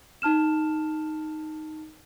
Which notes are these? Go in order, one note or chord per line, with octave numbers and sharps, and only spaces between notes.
D#4 A5 F6 E7